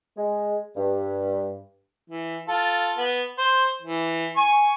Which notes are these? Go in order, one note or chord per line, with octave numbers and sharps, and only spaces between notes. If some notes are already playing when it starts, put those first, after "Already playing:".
G#3
G2
E3
F4 A4
B3
C5
E3
G#5 C#6